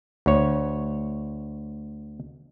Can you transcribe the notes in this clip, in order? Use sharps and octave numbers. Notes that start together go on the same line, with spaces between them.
D2 C#5